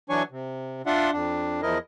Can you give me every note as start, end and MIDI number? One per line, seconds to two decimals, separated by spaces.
0.10 0.23 52
0.10 0.23 54
0.10 0.23 62
0.10 0.23 73
0.10 0.23 80
0.10 0.23 85
0.31 0.82 48
0.86 1.11 62
0.86 1.11 65
0.86 1.11 74
0.86 1.11 76
0.86 1.11 78
0.86 1.11 84
1.13 1.61 41
1.13 1.61 62
1.62 1.78 40
1.62 1.78 53
1.62 1.78 64
1.62 1.78 70
1.62 1.78 75